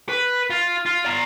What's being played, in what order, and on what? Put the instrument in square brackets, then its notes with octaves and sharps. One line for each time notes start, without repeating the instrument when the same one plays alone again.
[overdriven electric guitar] B4
F4
F4
D5 A#5